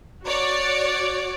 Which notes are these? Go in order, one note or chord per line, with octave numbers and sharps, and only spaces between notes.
F#4 C#5 D5